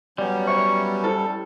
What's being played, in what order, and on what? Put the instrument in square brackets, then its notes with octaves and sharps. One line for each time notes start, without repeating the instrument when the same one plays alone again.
[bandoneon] F#3 B3 C#4 [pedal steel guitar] G3 [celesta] D5
[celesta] C5 D5 E5 [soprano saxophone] C#6
[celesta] E4 C5 [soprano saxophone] A4